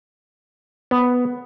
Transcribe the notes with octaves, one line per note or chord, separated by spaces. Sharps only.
B3